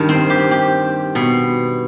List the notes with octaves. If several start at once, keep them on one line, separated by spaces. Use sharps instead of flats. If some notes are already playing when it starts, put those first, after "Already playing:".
Already playing: G2 D#3
C4
G4
G4
B2